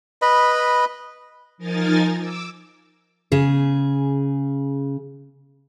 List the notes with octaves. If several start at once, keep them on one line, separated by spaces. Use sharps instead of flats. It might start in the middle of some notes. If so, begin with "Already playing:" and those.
B4 D#5 B5
F3 D#4 A#4 G#5 A6
D6 E6
C#3 G#4